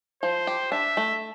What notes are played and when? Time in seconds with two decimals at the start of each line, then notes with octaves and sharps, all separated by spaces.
0.23 F3 C5
0.47 G4
0.72 D4 E5
0.97 A3